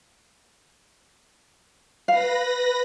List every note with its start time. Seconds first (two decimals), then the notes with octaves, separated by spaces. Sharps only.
2.08 B4 F5 B5 A#6